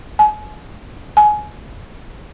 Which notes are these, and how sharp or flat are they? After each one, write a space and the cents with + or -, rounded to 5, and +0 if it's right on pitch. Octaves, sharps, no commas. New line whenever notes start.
G#5 +35
G#5 +20